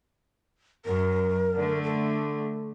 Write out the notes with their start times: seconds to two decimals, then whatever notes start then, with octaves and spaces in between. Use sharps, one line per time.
0.85 F#2 A#4
1.55 D3 A3
1.84 A4